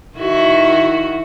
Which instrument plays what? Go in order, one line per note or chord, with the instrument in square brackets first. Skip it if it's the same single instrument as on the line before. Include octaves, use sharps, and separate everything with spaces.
[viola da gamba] D#3 E4 F#4